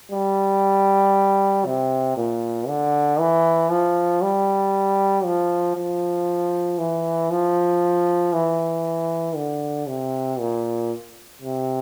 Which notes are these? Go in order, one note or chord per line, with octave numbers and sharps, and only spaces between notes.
G3
C3
A#2
D3
E3
F3
G3
F3
F3
E3
F3
E3
D3
C3
A#2
C3